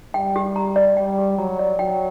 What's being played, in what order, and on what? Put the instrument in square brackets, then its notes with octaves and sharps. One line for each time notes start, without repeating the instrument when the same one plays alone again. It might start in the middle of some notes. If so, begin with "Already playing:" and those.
[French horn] G3 [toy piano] G5
[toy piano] G4
A#5
D5
[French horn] G3 [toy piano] G5
[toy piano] G4
[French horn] F#3 [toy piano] A#5
[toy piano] D5
[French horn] F#3 [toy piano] G5